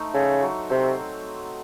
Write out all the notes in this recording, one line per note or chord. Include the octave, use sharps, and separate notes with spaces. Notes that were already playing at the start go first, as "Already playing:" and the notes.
Already playing: A3 D#4 C5
C#3 A4
F#3
C3 C4